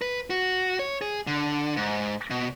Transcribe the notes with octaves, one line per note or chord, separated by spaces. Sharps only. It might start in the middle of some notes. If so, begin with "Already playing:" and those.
B4
F#4
C#5
G#4
D3
G#2
B2